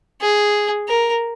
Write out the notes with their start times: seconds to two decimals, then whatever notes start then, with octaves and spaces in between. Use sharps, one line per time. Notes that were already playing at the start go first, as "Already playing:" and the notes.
0.21 G#4
0.88 A#4